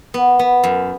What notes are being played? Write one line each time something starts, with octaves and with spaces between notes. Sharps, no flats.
B3
B3
F#2